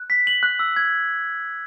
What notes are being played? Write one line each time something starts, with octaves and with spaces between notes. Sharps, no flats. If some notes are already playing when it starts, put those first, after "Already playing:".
Already playing: F#6
B6
F#7
F#6
E6
G#6